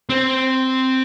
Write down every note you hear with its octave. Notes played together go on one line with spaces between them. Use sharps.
C4